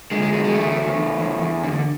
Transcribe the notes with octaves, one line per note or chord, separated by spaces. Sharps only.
D3 G#3
G#3
E2 G#3
G#3
D3 A3
E2
E2
E2
E2
D3